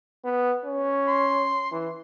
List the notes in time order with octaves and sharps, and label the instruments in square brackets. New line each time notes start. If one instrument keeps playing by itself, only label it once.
[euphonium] B3
C#4
[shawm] C6
[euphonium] E3